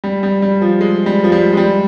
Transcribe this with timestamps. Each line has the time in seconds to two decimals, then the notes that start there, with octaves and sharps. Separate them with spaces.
0.04 G3
0.23 G3
0.42 G3
0.62 F3
0.81 G#3
1.06 G3
1.24 F3
1.32 G3
1.52 G#3
1.57 G3